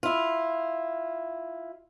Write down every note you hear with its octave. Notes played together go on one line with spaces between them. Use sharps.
E4 F4